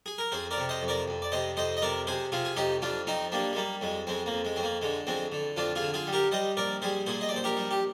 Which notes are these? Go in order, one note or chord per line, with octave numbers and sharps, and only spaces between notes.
G#4
A#4
F2 G#4 C5
A#4 D5
C3
C5 D#5
F2
A#4 D5
F2
D5
C3 C5 D#5
F2 C5 D#5
D#5
C3 A#4 D5
C3 G#4 C5
C3 F4 G#4
G#4
F2 D#4 G4
F2 D4 F4
F3 C4 D#4
G3 A#3 D4
G#3
G3 A#3
F2 G#3
F2 G#3 C4
A#3
F2
G#3
F2 C4
A#3
D3 G#3
F2 G#3 C4
D3
F2 D4 F4
F4 G#4
D3
F4 G#4
G3
G4 A#4
G3 C5 D#5
A#1 A#4 D5
G3 G#4 C5
A#2 G#4 C5
D#5
D5
A#1 C5
G4 A#4
G3
G4